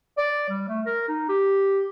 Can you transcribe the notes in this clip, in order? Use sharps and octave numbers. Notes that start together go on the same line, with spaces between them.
D5
G3
A3
A#4
D#4
G4